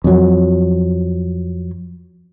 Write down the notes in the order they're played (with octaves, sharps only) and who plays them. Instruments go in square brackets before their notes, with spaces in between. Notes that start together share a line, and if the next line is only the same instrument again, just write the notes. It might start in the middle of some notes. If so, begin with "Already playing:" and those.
[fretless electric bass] F2 F#3